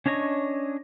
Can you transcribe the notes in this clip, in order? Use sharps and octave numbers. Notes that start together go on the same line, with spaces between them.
C#4 D4 C#5 D#5 C#6